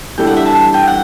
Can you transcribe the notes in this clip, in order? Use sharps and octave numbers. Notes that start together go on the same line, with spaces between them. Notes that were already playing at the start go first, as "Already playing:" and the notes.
E3 G3 D4 A4 G5
F#5
E5
A5
G5
F#5